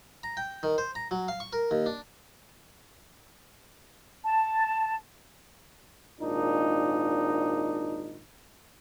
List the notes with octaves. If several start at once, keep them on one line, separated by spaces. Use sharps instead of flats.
A#5
G5
D#3
C5
A#5
F#3
F5
C#6
A#4
D#2
D4
A5
G#1 A#2 D4 D#4